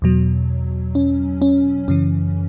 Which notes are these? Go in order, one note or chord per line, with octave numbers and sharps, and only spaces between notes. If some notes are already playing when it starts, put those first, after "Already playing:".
E2 B2 F#3
C#4
C#4
F#2 C#3 E3 C#4